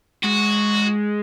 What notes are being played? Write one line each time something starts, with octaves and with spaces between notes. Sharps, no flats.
G#3 F#4